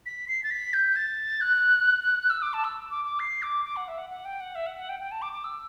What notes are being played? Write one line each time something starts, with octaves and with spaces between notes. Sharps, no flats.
B6
C7
A6
B6
G6
A6
F#6
E6
D6
A5
E6
D6
D6
C7
D6
D6
F#5
E5
F#5
F#5
G5
F#5
E5
F#5
F#5
G5
G5
A5
D6
D6
E6